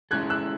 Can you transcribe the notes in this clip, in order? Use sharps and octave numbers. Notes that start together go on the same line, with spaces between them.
G#3 C#4 E4 A4 F#6 G#6
E6 F#6